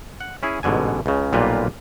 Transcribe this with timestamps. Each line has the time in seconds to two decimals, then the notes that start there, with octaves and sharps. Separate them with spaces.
0.21 F#5
0.43 C#4 E4 G#4
0.63 A1 G#2 B2 D3 G#5
1.06 C#2 C#3
1.33 B1 A#2 G3 A#3 F4 B4